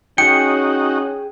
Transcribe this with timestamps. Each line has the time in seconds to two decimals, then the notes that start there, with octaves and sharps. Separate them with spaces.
0.18 C#4 D#4 F#4 G#4 G5 C#7